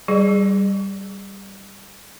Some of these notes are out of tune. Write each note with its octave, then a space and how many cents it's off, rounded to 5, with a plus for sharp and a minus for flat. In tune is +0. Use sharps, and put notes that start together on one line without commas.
G3 +0 G#4 +0 D#5 -45